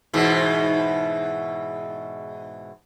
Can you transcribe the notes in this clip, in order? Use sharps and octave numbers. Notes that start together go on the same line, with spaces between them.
G#2 B2 E3